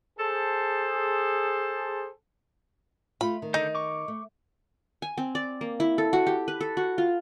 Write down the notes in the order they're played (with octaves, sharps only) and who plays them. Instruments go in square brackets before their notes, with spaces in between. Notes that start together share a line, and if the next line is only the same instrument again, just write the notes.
[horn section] G#4 A4 C5
[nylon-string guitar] A3 F4 [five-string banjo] B5
[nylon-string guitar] D#3
[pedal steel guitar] D3 A4 G6 [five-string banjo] D#4
[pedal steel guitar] C#6 D6
[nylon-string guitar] A3
[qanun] G#5
C4
D5
A#3
E4
A4
F#4
G4
B4
A4
F#4
F4